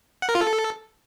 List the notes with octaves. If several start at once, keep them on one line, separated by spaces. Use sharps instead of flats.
F#5
A#4
F4
A4